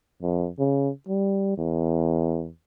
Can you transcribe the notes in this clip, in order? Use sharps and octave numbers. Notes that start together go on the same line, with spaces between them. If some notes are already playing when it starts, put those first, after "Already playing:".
F2
C#3
G3
E2